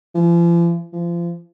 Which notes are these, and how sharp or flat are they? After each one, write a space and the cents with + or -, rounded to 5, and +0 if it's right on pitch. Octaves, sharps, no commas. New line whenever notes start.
F3 -45
F3 -30